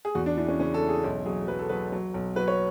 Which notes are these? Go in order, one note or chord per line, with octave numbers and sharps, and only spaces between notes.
G#4
E2 F#4
D4
E3 D4
C#4
C#3 C#4
A4
E3
G#4
B1 E4
F#3 G#4
F#3 B4
A4
F#3 B4
F#3
B1
F#3 B4
C#5